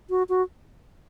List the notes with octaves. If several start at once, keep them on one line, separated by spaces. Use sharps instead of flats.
F#4
F#4